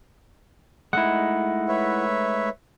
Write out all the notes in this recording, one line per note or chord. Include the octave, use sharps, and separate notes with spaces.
G#3 A3 D#4 E4 F#5
B4 C#5 E5